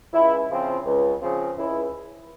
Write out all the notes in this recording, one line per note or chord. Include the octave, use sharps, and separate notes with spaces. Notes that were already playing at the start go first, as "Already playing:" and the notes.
C#2 E4
C#3 F3 C4
C#2
C#3 F3 C4
C#2 E4